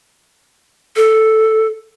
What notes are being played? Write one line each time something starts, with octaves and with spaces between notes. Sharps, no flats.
A4